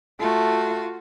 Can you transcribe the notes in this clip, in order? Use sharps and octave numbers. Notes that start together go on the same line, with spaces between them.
A3 F4 F#4